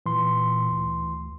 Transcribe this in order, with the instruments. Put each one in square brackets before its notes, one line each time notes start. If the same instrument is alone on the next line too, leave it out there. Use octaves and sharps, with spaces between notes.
[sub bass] A#2 [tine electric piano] E3 C6
[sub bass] D2